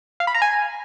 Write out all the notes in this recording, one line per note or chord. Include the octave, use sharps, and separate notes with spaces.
F5
B5
A#5
G#5